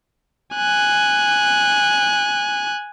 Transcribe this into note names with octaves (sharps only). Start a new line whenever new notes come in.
G#5 F#6